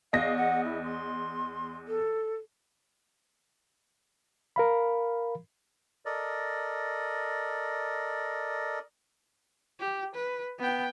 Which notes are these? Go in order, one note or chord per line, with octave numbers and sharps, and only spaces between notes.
E2 D#5 F5 A#6
F#5
E4
C6
A4
A#4 F5 B5
A4 A#4 D5 D#5
G4
B4
B3 G5